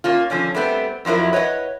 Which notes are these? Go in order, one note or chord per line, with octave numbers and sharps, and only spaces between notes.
A#3 C#4 F4
D3 F3 C#4 D4
G3 A3 B3 C4
F2 F3 F#3 E4 A#4
B4 C#5 D#5 F#5